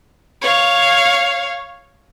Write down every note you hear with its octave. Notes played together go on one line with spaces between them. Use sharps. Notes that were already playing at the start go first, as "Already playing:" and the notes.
C#5 F5